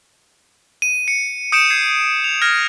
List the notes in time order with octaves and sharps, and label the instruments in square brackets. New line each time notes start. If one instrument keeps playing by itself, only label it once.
[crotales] D#7
C#7
D#6 G6 C#7 D7 E7
G6 G#6 C7 C#7
F7
F6 G#6 A#6